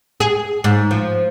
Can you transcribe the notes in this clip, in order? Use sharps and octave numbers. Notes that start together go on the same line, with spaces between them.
G#4
G#2
F3